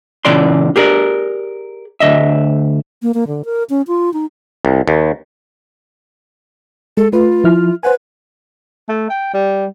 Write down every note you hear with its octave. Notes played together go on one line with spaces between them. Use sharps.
A#2 C#3 E3 D5 C6
G4 G#4 A#4 D5
D2 D#5 E5
A#3
A#3
D3
A#4
C#4
F4
D#4
C2
D#2
G#3 A4
A3 F4 B4
F3 E4 F6
B4 C5 F#5 G#5
A3
G5
G3